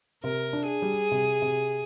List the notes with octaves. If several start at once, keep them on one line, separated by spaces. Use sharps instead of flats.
C3 A#4
D4
G#4
G3
C3
C3